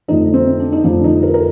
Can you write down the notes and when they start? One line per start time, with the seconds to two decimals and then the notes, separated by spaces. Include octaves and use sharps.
0.08 F2 D3 F3 A3 D#4
0.34 C4
0.60 D4
0.72 D#4
0.84 F2 D3 F3 A3 D4
1.04 D#4
1.23 A#4
1.34 A#4